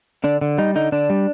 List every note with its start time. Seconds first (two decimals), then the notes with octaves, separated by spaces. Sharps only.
0.24 D3 D4
0.41 D3
0.58 G3 D#4
0.75 D3 D#4
0.92 D3 D4
1.10 G3